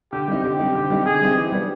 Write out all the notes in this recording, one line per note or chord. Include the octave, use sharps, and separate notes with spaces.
D3 G4
G3 C4 D#4
D3 G4
G3 C4 D#4
D3
G3 C4 D#4
D3 G#4
G3 C4 D#4
E3 G4
G3 B3 D4